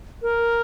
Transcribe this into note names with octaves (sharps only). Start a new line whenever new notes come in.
A#4